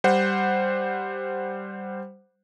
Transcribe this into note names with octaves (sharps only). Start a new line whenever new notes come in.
G3 C5 F#5